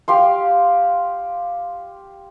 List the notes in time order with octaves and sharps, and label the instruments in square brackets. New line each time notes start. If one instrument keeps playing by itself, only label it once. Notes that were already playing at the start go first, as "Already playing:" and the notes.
[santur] G4 F5 C6